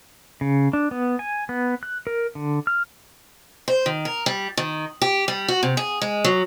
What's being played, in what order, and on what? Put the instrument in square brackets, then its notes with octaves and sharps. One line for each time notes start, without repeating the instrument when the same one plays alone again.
[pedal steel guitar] C#3
D4
B3
G#5
B3
F#6
A#4
D3
F6
[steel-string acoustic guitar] C5
D#3
A#4
G3
D#3
G4
G3
F#4
C3
G#4
G#3
F#3